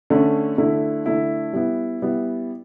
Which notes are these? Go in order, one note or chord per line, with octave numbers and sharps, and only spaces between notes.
D3 A3 C#4
D3 A3 E4
D3 A3 E4
G3 B3 E4
G3 B3 E4